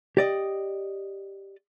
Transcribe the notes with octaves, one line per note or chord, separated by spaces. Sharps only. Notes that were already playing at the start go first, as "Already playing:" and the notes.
G4 D5 D#5